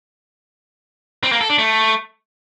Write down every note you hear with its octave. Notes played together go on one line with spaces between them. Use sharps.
C4
A#3
A4
D4
A3